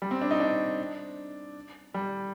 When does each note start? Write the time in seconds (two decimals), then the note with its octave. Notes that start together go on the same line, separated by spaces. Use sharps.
0.02 G3
0.11 C4
0.22 D4
0.31 D#4
0.40 D4
1.94 G3